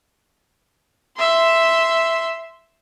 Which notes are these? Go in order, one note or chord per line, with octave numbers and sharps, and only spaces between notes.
E5 C6